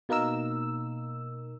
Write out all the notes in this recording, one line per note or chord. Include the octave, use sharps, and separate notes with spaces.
B2 A#3 D#4 A#4 E6